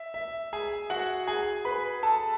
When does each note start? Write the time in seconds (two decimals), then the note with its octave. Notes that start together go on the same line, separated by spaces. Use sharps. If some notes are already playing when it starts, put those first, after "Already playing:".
Already playing: E5
0.14 E5
0.53 G#4 G#5
0.90 F#4 F#5
1.27 G#4 G#5
1.65 B4 B5
2.03 A4 A5